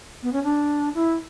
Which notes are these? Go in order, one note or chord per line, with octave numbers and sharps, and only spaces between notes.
B3
C#4
D4
E4